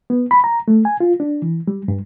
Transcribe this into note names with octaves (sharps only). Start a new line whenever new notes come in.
B3
B5
A#5
A3
G#5
F4
D4
E3
G3
G2